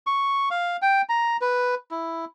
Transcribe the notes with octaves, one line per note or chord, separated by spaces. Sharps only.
C#6
F5
G5
A#5
B4
E4